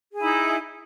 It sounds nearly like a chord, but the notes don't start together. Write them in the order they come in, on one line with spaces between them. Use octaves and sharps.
G#4 E4 D#4